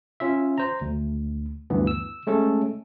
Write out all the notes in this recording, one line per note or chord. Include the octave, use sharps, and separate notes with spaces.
C#4 F4 E5
C5 A#5
D2
D2 G2 E3 B3
E6
G#3 A3 C#4 A4